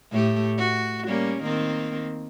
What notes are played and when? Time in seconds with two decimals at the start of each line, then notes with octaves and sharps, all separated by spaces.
0.11 A2 A3 G4
0.58 F#4
1.07 G3 A#3 C#4
1.43 D#3 A#3 C4